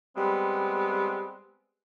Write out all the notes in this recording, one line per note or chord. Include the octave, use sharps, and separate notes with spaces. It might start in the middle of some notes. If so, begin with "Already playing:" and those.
G3 G#3 B3 C4